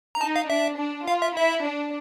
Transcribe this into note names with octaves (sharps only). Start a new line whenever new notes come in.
A#5
D#4 A5
F5
D4 E5
D4
F4 F5
E5
E4 E5
D4